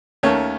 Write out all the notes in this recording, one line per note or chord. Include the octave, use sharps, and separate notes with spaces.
D#2 D#3 A3 C#4 C#5